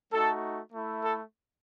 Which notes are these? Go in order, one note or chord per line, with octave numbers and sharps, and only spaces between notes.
A3 D#4 F#4 A4
A3 E4
A4